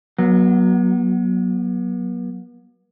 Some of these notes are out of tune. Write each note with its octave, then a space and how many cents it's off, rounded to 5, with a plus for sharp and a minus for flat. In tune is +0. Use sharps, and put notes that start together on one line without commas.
F#3 +0 B3 -40